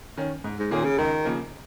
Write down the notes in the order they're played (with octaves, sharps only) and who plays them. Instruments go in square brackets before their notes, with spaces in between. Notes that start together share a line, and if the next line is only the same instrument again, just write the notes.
[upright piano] D#3 C#4
G#2
[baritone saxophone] G#2
[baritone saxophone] A#2 [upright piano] D#3 A#3 C#4 G#4
[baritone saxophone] C#3
[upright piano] C#2 [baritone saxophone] D#3
[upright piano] C#3 F3 A#3